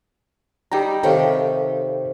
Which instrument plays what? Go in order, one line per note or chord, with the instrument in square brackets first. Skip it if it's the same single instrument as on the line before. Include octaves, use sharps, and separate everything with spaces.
[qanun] G3 D#4 [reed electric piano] G4 G5 A#5
[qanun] C3 D#3 G4 [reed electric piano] A4 C#5 F5